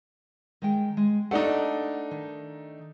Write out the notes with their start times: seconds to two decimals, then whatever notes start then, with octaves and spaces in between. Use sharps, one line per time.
0.62 D#3 G#3 G5
0.97 G#3
1.31 A3 D4 D#4 F#5
2.11 D#3